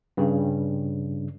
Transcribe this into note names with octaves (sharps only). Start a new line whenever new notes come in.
G2 C#3